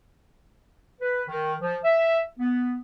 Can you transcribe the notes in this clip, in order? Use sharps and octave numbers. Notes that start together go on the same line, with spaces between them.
B4
D#3
F3
E5
B3